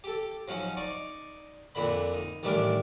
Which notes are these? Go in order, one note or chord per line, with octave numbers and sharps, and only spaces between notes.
G4 A4
F3 F#3 C#4 D#4
D#4 D5 C#6
F2 A#2 D3 B5
D#4
A1 D#3 G3 A3 D4 A#4